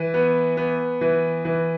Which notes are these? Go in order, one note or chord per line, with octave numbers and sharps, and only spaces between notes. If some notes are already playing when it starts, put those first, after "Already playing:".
Already playing: E3
B3
B3
E3
E3